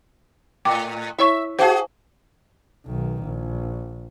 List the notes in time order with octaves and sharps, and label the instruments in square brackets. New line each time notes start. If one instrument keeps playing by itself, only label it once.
[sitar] A2 [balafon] G5 D6
[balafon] E4 C#5 C#6 [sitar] E5
[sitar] F#4 G#4 [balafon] C5 F5 A5
[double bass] B1 D#3
A#1